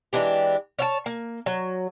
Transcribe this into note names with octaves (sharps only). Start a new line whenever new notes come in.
E3 G#3 D4 G4
C#5 F5 A5
A#3
F#3